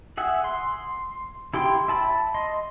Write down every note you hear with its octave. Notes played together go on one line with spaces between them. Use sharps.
G#4 E5 F#5
C6
E4 G4 G5 C6
E5 A5 B5
D#5 C6